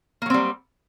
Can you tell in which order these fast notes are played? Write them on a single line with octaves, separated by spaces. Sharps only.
A#3 F#3 C4 G3